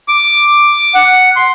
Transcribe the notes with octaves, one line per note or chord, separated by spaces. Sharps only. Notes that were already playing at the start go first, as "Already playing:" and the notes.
D6
F#5
C6